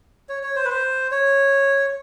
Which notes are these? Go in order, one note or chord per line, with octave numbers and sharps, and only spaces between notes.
C#5
C#5
C5
B4
C5
C#5